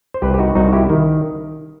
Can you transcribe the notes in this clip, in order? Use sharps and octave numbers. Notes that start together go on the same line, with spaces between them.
C5
C2 G4 B4
G4
D#4 F#4
C2 D#4 F#4
E4 G4
D#3